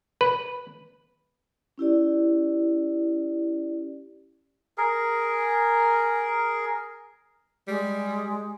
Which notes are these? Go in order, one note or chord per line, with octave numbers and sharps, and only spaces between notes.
B4
C#4 E4 G4 D5
G#4 A#4
G3 G#3